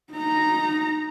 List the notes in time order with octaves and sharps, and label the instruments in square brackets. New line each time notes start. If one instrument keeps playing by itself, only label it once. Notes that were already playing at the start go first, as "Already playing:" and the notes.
[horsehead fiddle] D#4 A#5